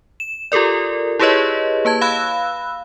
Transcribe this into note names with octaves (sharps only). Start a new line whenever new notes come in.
E7
F4 G4 A4 A#4 D5
E4 G4 G#4 B4 C#5 D#5
A#3 B4 A5 G#6
F5 B5 E6 F#6